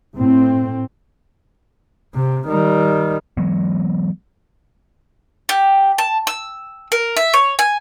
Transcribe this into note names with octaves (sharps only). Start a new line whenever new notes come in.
A2 C4
C3
D#3 G3
E3 F#3 G#3 B3
G4
A5
E6
A#4
E5
C#5
G#5